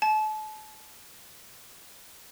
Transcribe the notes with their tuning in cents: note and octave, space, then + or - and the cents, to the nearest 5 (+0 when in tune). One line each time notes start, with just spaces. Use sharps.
A5 -35